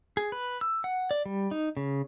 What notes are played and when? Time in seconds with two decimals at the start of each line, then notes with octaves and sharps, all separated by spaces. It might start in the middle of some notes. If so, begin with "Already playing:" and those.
0.17 G#4
0.32 B4
0.61 E6
0.84 F#5
1.11 D5
1.26 G3
1.51 D#4
1.77 C#3